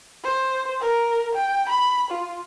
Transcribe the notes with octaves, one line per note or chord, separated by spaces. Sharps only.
C5
A#4
G5
B5
F4